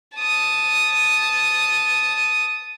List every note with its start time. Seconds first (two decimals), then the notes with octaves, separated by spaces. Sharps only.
0.17 A5 D#6